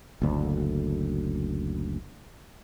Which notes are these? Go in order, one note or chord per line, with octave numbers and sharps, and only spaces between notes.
F#1 D2